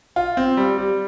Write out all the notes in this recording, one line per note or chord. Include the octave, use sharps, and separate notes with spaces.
F4
C4
G3
G3